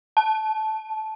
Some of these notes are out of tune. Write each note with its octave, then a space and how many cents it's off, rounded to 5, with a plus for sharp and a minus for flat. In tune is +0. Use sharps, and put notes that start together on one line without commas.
A5 -15